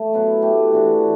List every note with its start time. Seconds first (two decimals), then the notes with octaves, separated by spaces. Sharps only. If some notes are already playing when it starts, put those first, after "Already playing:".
Already playing: A3
0.13 F#3 B3 E4 B4
0.42 A3 E4 G4
0.72 E3 B3 D4 F#4